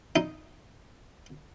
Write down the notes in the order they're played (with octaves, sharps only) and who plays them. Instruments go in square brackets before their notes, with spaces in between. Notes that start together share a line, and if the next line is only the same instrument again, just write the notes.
[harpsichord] D#4